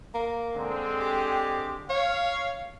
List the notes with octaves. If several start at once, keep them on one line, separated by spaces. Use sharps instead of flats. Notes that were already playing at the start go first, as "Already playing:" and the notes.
A#3
D3 G#3 C4
G4
C#5 F5